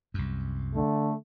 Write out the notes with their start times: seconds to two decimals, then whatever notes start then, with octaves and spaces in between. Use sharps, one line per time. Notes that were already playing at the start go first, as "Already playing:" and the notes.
0.14 C2 F#2
0.75 D3 A3